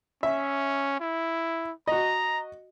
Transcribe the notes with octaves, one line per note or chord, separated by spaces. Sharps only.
C#4 E5
E4
F#4 D#5 A#5